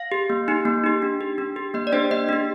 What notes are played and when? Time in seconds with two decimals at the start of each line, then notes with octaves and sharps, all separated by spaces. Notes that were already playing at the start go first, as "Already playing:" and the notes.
Already playing: F5
0.12 G4
0.30 A#3
0.48 D#4 G4
0.65 A#3
0.84 D#4 G4
1.02 D4
1.21 G4
1.38 D4
1.56 G4
1.74 A#3 D#5
1.87 D5
1.93 D4 G4 C5
2.11 A#3 D#5
2.29 D4 G4